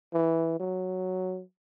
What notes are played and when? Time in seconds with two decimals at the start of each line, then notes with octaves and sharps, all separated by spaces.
0.14 E3
0.60 F#3